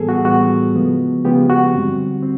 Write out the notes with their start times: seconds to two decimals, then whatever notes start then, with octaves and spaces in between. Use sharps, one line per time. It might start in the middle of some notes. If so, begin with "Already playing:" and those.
Already playing: A2 E3 G3 B3 G#4 A4
0.09 F#4
0.25 A2 E3 G3 B3 F#4
0.75 C#3 F3 G#3 B3
1.25 C#3 F3 G#3 B3 G4
1.50 F#4
1.74 G2 D3 G3 C4
2.23 C4